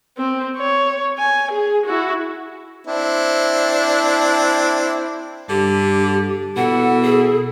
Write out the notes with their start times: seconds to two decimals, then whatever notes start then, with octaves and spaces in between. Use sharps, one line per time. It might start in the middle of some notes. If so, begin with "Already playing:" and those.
0.17 C4
0.57 C#5
1.18 G#5
1.52 G#4
1.86 E4 F#4
2.87 C4 D4 E4
5.49 G2 D3 G4
6.56 B2 E3 A4 F#5
7.03 G#4